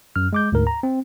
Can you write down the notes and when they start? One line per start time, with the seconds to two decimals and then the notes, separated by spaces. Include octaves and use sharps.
0.16 F#2 F6
0.33 G#3 D6 G6
0.52 D2 G#2 A#4
0.67 A#5
0.83 C4